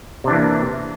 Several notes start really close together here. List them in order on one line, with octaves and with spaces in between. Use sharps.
C3 D4 E3 A#3